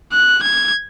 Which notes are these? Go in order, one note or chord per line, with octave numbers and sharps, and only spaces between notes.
F#6
G#6